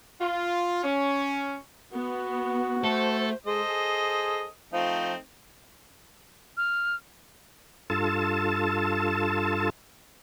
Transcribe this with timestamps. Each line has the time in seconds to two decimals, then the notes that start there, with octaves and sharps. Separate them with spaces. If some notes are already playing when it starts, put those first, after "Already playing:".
0.21 F4
0.84 C#4
1.93 B3 F#4
2.84 A3 A4 C5
3.46 G#3 A4 C5 D#5
3.68 G#4
4.73 F3 A3 C4 D#4
6.57 F6
7.90 G2 F4 A4 A5